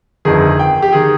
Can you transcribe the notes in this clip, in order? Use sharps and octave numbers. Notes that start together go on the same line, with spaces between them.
G1 F2 D#3 G#4
G5
G4
D#3 G#4